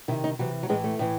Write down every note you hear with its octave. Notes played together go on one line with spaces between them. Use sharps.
C3 D#3 E4
D#4
C3 E3 F#3
F#3
A2 E3 G#3
A3
A2 E3